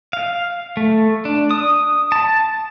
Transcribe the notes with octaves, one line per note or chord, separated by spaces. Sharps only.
F5
A3
D4
D#6
A5